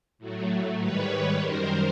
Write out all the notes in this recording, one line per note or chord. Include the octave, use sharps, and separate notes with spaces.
A2 F#3 A3
G#2 D#3 G3 B4 C#5
F#2 D#3 G3 A#4 C5